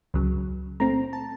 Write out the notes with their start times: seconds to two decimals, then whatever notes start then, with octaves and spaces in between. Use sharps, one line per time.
0.14 C#2 C#3 F#3
0.80 A#2 A3 C4 A#5
1.13 A5